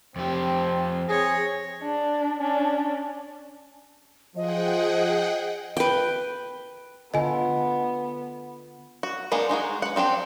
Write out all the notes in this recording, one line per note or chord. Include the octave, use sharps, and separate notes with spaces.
F2 C4 G4
C4 G#4 C#5 A#6
D4
C#4 D4
F3 G#4 D#5 F#5 G5
B4 G5
D3 B3 F4 A4 D#5 G#5
F#4
G#3 A#3 B3 D4 D#4
G#3 D#4 F#4 G#4
B3 F#5
F3 C4 D4 G4